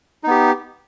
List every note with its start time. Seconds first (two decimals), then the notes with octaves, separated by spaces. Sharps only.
0.24 D#4
0.27 B3
0.31 G4